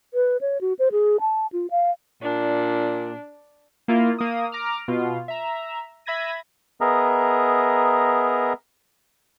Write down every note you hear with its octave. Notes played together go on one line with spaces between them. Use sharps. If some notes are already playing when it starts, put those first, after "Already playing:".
B4
C#5
F#4
C5
G#4
A5
F4
F5
A#2 D4
A#3 E4 F4
A#3 D#6
A#5 D6 F6
B2 F4
E5 A#5
E5 B5 G#6 A#6 D#7
B3 G#4 A#4 D#5 E5 A#5